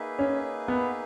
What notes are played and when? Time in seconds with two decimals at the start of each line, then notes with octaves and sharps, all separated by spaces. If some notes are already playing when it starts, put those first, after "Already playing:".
Already playing: A#3 D#4 G#4 B4 E5
0.19 C#4
0.68 B3